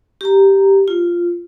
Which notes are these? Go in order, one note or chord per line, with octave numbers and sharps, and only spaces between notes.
G4 A#5
F4